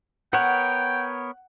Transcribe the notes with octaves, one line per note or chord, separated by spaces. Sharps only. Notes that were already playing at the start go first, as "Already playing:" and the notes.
B3 A#4 C#5 F#5 G5